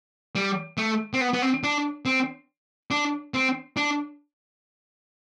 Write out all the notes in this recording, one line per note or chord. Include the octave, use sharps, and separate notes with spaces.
G3
A3
C4
B3
B3
C4
D4
C4
D4
C4
D4